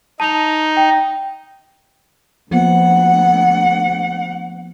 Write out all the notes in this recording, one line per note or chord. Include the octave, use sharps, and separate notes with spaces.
D#4 A5 F7
G5
D2 F3 A#3 B3 F#5